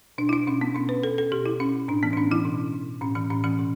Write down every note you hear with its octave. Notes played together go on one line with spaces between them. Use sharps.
B2 D4
E4
D4
B2 C#4
B3
B2 C#4
B4
B2 A4
A4
B2 G4
E4
B2 C#4
A2 D4
E3 B3
D4
A2 C#4
E3 E4
B2
B2
A2 C#4
E3 C#4
A2 C#4
E3 C#4
B2